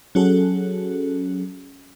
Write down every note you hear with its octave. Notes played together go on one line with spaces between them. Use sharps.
F#3 C#4 F#4 G#4 A4